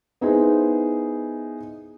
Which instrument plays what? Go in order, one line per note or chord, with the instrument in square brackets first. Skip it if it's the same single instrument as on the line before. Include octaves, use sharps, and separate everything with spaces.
[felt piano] B3 D#4 E4 G#4 C5